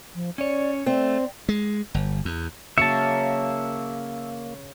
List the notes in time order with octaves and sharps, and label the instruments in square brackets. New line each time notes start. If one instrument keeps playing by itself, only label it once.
[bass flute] F3
[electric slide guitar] C#4 C#5 [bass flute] D5
[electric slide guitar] A3 [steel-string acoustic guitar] C4 [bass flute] D5
[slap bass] G#3
G1
E2
[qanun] C#3 F#3 C#5 [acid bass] A#3 [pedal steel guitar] E5 A5 [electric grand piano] C#7